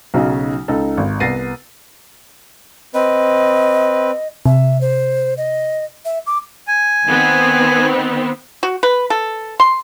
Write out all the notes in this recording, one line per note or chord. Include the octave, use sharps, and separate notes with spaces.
B1 C#3 F#3 D#4
C#2 D#4 A4
G#1
C2 B3 A6 A#6 C7 D#7
C4 B4 D#5
C3 E5
C5
D#5
E5
D6
G#5
D#3 B3 C4
F#4
B4
A4
C6